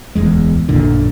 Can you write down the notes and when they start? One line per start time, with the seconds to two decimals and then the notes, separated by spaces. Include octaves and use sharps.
0.15 D1 B1 E2 G#3
0.69 A1 F#2 A#2 D3